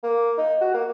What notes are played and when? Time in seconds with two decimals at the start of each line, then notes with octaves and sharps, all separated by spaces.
0.03 A#3
0.38 D#4
0.61 F#4
0.74 A#3